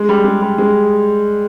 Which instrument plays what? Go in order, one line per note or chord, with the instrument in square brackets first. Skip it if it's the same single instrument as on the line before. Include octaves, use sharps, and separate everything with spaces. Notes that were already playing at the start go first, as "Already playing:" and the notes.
Already playing: [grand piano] G#3
G3
G#3
G3
G#3